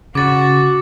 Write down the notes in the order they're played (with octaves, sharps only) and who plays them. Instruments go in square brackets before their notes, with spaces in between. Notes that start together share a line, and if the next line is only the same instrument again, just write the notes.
[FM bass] C#3 [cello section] F#4 [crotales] D6 A6